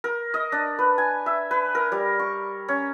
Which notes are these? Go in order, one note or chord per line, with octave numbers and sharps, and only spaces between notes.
A#4
D#5
D4
B4
G#5
E5
B4
A#4
G3
C#6
C#4